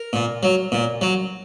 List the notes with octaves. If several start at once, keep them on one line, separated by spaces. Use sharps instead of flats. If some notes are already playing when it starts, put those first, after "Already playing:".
Already playing: A#4
A#2
F#3
A#2
F#3